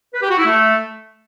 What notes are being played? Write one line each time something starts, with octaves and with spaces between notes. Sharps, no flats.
B4
G4
F#4
E4
A3